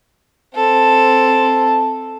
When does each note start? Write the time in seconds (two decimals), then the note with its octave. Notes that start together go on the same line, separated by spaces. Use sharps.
0.55 C4 A4